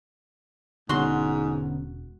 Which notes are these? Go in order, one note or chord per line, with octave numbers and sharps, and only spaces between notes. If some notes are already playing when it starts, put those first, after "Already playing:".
E1 G#2 D3 B3 C#4 F#4 C6